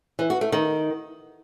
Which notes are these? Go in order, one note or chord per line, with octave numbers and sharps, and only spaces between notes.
E3
F#4
A3
D#3